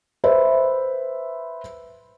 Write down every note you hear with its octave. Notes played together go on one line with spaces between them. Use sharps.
B4 C5 E5